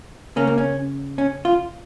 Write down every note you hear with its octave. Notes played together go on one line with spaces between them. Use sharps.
C#3 A#3 C#4
A#3
C#4
C#4
F4